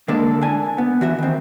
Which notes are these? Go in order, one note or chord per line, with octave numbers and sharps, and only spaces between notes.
D3 G#3 A#3 D4 A4 D5
D4 G#5
B3
E3 F#4 E5
D#3 C4